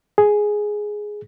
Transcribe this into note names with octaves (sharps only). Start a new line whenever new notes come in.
G#4